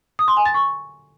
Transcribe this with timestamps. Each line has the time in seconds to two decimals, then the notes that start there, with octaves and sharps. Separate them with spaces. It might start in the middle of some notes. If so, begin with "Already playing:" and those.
0.19 D#6
0.28 C6
0.37 G#5
0.46 A6
0.54 C#6